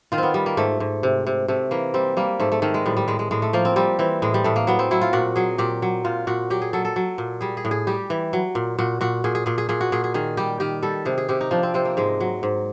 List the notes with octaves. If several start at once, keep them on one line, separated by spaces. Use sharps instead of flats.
D#3 F4
B3 C4
G3
A#3
G#2 A3
G#2
C3
C3
C3 A3
E3 A#3
G3 C4
G3 A#3
G#2 A3
A3
D#3 A3
G#3
A2 G3
G3
A2 G#3
G#3
A2 G#3
A3
F3 A#3
C4
G3 C4
E3 C4
A2 G#3
G3
A2 A3
A#3
F#3 B3
C4
F#3 E4
F4
A#2 F#4
F#3 G#4
A#2 G4
F#3
A#2 F4
A#2 F#4
F#3 G4
G#4
F#3 A4
A4
F#3
A#2
G3 G#4
G#4
A2
G#4
G3 G4
E3
F#3
A#2
A#2 F#4
A#2 F#4
A#2 G#4
G#4
A#2 G#4
G#4
A#2 G#4
F#4
A#2 G#4
G#4
D#3 G#4
G3 G4
D#3 G4
G3 A4
C3 G#4
G#4
C3 G4
D#4
F3 D4
C4
C3 C4
A#3
G#2 G#3
F#3
G#2